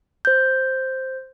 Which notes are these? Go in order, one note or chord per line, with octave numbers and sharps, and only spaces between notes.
C5 G6